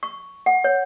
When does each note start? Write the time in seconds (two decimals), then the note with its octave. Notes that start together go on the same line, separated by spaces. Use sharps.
0.03 C#6
0.46 F#5
0.64 C#5